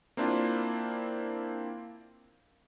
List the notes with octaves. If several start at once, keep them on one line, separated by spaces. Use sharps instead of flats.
A#3 C4 D4 E4 F4